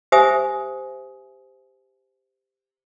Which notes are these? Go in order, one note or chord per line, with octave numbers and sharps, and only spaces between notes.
G4 C5 E5 G#5 D#6